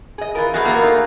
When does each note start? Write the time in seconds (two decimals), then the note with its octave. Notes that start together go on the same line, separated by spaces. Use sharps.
0.18 G#4 D#5
0.35 E3 F4 A#4
0.54 A3 B3 F#4 G#4 F5
0.65 A2 D3 A#3 B3
0.82 A3 D#4